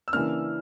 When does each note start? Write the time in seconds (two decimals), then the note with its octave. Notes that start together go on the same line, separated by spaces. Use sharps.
0.08 E6
0.13 C#3 E3 A#3 D4 F6